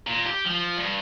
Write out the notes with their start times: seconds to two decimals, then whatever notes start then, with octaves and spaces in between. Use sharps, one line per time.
0.07 A#2
0.26 G4
0.45 F3
0.77 G2